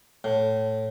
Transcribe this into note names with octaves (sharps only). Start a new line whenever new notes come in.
A2